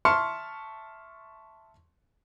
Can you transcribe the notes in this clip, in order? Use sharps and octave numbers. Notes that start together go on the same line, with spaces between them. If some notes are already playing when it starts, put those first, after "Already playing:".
E5 A5 C6 C#6 F6 C#7